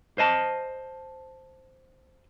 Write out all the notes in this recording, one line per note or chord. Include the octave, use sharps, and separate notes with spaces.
C5 D#5 A5